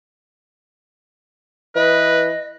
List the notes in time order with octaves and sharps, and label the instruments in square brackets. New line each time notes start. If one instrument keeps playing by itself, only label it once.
[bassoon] E3 [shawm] B4 [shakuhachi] D#5